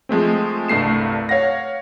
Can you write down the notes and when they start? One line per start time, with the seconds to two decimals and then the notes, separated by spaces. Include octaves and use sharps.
0.09 F3 G#3 A3 C4
0.68 C2 G2 A3 C7 E7
1.29 C#5 F5 F#5 A#6